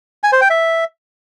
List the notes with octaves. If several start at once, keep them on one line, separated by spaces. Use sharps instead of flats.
G#5
C5
G5
E5